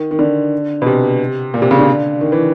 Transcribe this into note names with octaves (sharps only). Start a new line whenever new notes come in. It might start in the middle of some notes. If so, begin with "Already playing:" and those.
Already playing: D#3
D#3
D3
B2
C3
A#2
C3
C#3
D3
D#3
E3